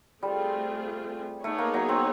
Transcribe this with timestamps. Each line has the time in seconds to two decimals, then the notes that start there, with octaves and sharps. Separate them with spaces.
0.23 G3 A3 C4 F4 G#4
1.44 A3 B3 D#4 G#4 C#5
1.58 A#3
1.74 F#3
1.89 C4